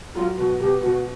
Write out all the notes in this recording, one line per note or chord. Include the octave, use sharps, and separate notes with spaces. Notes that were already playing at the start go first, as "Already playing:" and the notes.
F#3 F4
B2 F#4
B2 G4
B2 F#4